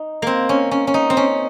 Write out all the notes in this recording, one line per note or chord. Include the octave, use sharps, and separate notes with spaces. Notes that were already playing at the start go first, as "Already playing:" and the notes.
Already playing: D#4
A#3 C4
C#4
C#4
C#4
D#4
C4
C#4